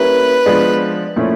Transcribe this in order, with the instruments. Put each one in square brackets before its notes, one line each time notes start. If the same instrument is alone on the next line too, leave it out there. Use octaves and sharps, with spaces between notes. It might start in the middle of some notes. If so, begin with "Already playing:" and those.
Already playing: [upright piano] G3 A#3 C#4 E4 G4 [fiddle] B4
[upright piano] F3 G#3 B3 D4
A#2 F3 A3 C#4 E4